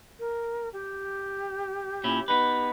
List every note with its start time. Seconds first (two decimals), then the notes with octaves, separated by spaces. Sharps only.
0.19 A#4
0.72 G4
2.04 A#2 C#4 E4
2.28 B3 D#4 B4